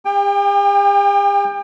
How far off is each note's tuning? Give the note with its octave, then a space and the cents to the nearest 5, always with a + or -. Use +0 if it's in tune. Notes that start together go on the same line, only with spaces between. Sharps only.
G4 +45 G5 +25